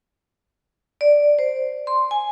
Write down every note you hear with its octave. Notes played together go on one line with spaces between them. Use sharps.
D5
C5
C6
G#5